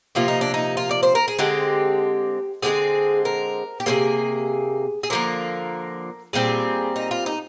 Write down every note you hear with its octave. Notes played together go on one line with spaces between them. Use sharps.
C3 F3 A#3 F4
D#4
D4
D#4
F4
D5
C5
A#4
G#4
D3 G#3 C4 G4
D3 F3 G#3 C4 G#4
A#4
G4
C3 F3 A#3 G#4
G#4
D3 F3 A#3 A#4
A#2 G3 C4 G#4
D#4
F4
D#4